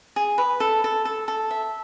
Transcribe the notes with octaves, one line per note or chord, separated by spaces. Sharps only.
G#4
B4
A4
A4
A4
A4
E5